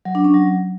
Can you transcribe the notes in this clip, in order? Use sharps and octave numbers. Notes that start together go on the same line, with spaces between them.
F#3
D4
C#4
F#3